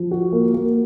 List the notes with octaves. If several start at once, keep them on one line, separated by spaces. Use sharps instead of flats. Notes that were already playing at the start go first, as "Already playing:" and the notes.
Already playing: F3
F#4
A#3
A#3